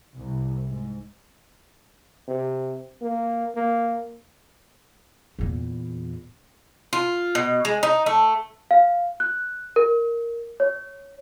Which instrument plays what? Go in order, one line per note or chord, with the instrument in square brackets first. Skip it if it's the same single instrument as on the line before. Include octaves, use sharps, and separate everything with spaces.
[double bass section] C2
G#2
[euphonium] C3
A#3
A#3
[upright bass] E2 A#2
[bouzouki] F4
B2
G#3
D#4
A3
[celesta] F5
F#6
A#4
C#5